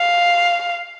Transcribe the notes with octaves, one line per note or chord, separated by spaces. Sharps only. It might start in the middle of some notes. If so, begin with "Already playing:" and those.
Already playing: F5